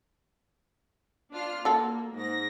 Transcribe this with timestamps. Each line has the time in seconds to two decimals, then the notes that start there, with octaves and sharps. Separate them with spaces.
1.33 D4 F4 F6
1.65 A#3 F#4 A4
2.16 G#2 A#6